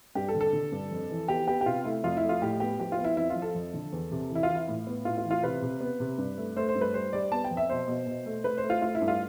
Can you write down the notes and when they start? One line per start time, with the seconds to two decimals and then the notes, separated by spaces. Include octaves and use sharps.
0.15 G2 G4
0.28 A4
0.34 D3
0.41 A4
0.53 D3
0.72 G2
0.91 F2
1.10 E3
1.28 B3 G4
1.47 B3 G4
1.61 G4
1.66 C3 F4
1.85 A3 E4
2.04 F2 F4
2.17 E4
2.23 A3
2.29 F4
2.42 A2 G4
2.60 B3 G4
2.80 F3 G4
2.92 F4
2.98 B3
3.04 E4
3.17 F2 E4
3.30 F4
3.36 F3
3.42 A4
3.55 F2
3.74 D3
3.92 E2
4.11 C3
4.30 E3
4.35 E4
4.43 F4
4.49 E3
4.55 E4
4.68 A2
4.87 B3
5.05 A2 F4
5.18 F4
5.24 E3
5.31 F4
5.43 C3 B4
5.62 C3
5.80 B3
6.00 C3
6.18 G2
6.38 A3
6.56 A3 C5
6.69 C5
6.75 G2
6.81 B4
6.94 G3 C5
7.13 G3 D5
7.32 B3 A5
7.44 G5
7.51 F2
7.57 E5
7.69 B2 C5
7.88 B2
8.07 B2
8.26 A3
8.44 A3 B4
8.58 C5
8.63 A3
8.70 F4
8.82 A3 F4
8.95 E4
9.01 G2
9.08 F4